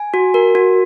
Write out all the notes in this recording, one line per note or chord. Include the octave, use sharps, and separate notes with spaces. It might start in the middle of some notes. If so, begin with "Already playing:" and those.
Already playing: G#5
F#4
A#4
F#4